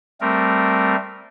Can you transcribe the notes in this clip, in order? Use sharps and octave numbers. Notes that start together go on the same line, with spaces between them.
G3 A3 C4 A#4